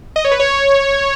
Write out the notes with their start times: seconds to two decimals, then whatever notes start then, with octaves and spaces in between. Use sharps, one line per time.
0.16 D#5
0.25 C#5
0.32 B4
0.40 C#5